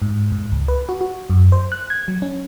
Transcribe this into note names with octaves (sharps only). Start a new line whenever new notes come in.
G#2
G#2
C#2
B4
F#4
F#4
F#2
C5
F#6
G#6
F#3
C#4